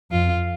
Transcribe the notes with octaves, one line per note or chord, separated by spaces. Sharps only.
F2 F4